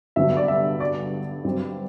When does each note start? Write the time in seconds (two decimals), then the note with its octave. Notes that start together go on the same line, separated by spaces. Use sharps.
0.16 G2 D3 F#3 B3 E5
0.37 D5
0.48 E5
0.80 D5
1.44 G2 F#3 C4